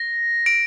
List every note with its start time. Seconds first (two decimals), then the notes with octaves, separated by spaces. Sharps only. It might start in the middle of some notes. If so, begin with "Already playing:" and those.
Already playing: A#6
0.46 D7